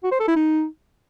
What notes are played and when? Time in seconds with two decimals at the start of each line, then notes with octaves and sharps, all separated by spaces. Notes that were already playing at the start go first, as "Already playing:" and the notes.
0.04 F#4
0.12 C5
0.20 A4
0.28 E4
0.36 D#4